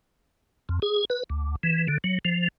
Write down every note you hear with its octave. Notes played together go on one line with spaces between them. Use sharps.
F2
G#4
B4
D2
E3
D3
F#3
F3